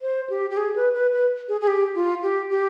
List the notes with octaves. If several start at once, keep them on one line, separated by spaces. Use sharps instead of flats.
C5
G4
G4
G#4
B4
B4
B4
G#4
G#4
G4
F4
G4
G4